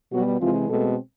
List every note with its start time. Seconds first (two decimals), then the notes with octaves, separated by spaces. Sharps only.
0.12 B2 F#3 G3 B3 F#4
0.40 C3 E3 F3 G#3 C4 F4
0.69 B2 G#3 A3 C4 A4